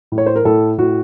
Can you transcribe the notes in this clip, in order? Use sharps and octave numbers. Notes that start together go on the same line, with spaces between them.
A2
C#5
C5
A#4
A2 A4
A2 F#4